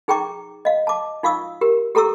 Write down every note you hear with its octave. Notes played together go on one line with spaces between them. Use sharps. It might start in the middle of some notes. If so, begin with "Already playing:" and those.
D#4 G#4 G5 A#5 C#6 D6
D#5 F5
A5 D6
D#4 F4 F5 C#6 D#6 E6
G4 A#4
G4 A4 A#5 C#6 E6